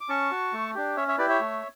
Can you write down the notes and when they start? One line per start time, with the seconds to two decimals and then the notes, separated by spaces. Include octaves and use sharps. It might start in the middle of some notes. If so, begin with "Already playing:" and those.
0.01 D6
0.09 C#4 A5 C#6
0.31 F#4
0.53 A3
0.75 D4 G4
0.96 C#4 C#5 E5
1.08 C#5 E5
1.18 E4 G4 B4 D5
1.29 C#5 E5
1.40 A3